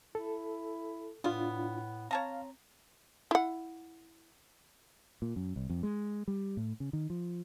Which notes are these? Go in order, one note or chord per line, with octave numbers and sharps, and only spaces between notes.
E4 A4
A2 B3 D4 F4
C4 C#5 F5 A5 A#5
E4 F#5
A#2
F#2
C2
F2
G#3
G3
A2
C#3
D#3
F3